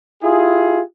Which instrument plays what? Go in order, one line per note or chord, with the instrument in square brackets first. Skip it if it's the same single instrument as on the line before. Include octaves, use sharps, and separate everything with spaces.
[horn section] E4 F4 G4 G#4